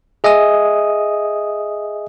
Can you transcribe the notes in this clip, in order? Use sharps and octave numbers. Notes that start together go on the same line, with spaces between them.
G#4 D#5 E5 G#5 D#6